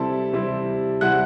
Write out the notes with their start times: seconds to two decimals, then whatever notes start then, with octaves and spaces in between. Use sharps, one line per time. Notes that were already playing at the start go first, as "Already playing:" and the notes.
Already playing: C3 G3 C4 E4 A4 A5
0.33 C3 G3 C4 E4
1.01 C3 G3 C4 E4 F#5 F#6